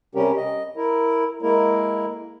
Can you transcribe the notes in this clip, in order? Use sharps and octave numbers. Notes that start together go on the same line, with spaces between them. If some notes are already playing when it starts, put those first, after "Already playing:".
C3 G3 C#4 G4 A#4
D#5
E4 A#4
G#3 A#3 E4 A#4